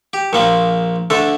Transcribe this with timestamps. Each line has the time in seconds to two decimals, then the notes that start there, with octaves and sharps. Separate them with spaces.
0.13 G4
0.33 A#1 A#2 F3 A#3
1.10 D2 D3 A3 A4